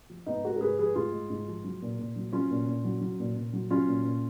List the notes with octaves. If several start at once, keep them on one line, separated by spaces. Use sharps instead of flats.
F3
G#2 B3 D#4
G#3 F#4 A#4
A#4
G#2 G#4 B4
F3 G#4 B4
G#2 F4 G#4
G#3
G#2
F3
F#3
A#2
A#2
F#3
F#3 C#4 F4
A#2
A#2
F#3
F#3
A#2
A#2
F#3
F#3 C#4 F4
A#2
A#2